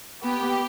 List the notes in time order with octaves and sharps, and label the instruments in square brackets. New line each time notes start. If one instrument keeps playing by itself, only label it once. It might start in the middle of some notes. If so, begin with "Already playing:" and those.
[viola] B3 [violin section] G4